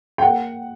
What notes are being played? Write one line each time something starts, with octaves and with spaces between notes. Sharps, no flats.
G5
A#3 F#5